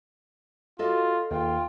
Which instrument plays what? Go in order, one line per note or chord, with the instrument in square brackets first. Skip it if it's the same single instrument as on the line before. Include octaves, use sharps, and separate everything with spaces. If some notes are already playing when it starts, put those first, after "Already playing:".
[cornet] F4 [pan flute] F#4 [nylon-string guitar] A4 D#5
[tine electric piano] D#2 [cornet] F4 [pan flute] G5